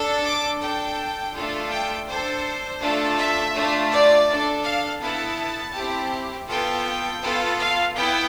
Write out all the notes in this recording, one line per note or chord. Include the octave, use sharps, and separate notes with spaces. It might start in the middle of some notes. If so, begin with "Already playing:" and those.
Already playing: D4 A4
D6
D4 A4 G5
A3 D4 F4 A4
G5
D4 A4 C5
A3 D4 F4 A4
E5
A3 D4 F4
D5
D4 A4
F5
B3 E4 A4 A5
C4 E4 G4
B3 F4 A4 G5
B3 F4 A4
F5
B3 E4 G5